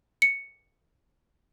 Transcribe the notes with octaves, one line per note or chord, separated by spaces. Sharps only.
C#7